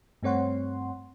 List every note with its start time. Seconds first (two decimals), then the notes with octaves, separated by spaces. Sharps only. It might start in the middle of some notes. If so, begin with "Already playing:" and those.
0.23 G2 A3 C4 C#5 F#5 C6